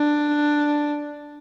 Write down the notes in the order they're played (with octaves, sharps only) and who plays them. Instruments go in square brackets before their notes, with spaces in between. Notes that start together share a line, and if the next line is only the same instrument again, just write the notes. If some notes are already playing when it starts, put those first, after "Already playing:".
Already playing: [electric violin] D4